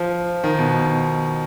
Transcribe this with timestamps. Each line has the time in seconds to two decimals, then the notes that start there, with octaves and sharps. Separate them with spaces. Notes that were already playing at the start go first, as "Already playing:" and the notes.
Already playing: F3
0.44 D#3
0.59 B2